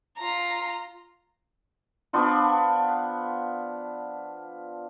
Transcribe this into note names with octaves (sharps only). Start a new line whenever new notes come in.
F4 A#5
F3 B3 D4 F4